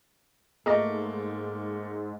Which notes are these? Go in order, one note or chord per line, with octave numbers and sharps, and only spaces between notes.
G#2 A3 A#3 G#4 D#5 A#5